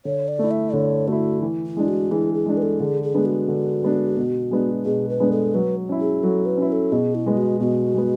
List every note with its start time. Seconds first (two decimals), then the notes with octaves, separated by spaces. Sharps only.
0.05 D3 C#5
0.28 D5
0.39 A3 E4
0.51 E5
0.73 D3 C#5
1.07 A3 E4 F#4
1.42 E3
1.66 E4
1.77 G#3 D4
1.88 F#4
2.11 E3 G#4
2.34 G#4
2.46 G#3 D4
2.57 B4
2.62 A4
2.79 D3 G#4
3.03 G#4
3.14 G#3 B3 D4
3.25 F#4
3.48 D3
3.83 G#3 B3 D4
4.17 B2
4.51 G#3 B3 D4
4.85 B2 G#4
5.09 B4
5.20 G#3 B3 D4
5.32 A4
5.54 F#3 B4
5.89 C#4 E4
6.01 G#4
6.23 F#3 A4
6.46 B4
6.58 C#4 E4
6.69 B4
6.72 A4
6.92 B2 G#4
7.15 E4
7.26 G#3 B3
7.37 F#4
7.60 B2 F#4
7.95 G#3 B3